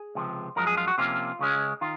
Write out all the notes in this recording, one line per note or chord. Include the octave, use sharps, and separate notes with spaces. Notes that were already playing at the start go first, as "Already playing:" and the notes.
Already playing: G#4
C#2 C3 F3
F#2 F3 G#3 A#4
G#4
F4
F#4
C3 F3 A#3 C#4 F4
C#2 C#3 G#3 C#4
D#3 F4